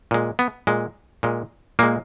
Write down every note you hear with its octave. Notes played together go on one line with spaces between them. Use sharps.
A#2 G#3
B3
A#2 G#3
A#2 G#3
A#2 G#3 A#3